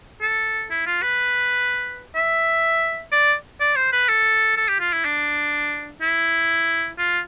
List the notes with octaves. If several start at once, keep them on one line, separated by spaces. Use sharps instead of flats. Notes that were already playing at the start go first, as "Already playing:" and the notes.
A4
E4
F4
B4
E5
D5
D5
C5
B4
A4
A4
G4
F4
E4
D4
E4
F4